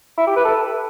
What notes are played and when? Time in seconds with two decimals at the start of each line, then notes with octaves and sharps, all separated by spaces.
0.18 E4
0.27 G4
0.36 B4
0.45 A4